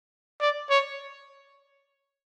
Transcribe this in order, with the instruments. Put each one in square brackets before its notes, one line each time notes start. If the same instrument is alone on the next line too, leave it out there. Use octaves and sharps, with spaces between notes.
[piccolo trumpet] D5
C#5